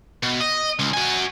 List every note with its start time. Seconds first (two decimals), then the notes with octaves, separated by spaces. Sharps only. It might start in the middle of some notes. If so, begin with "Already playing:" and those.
0.23 B2
0.40 D#5
0.79 C#2
0.94 F#4 G#5